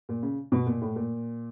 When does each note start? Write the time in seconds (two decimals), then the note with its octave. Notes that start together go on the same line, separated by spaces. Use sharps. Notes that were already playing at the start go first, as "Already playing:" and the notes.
0.09 A#2
0.23 C#3
0.52 B2
0.67 A#2
0.81 A2
0.96 A#2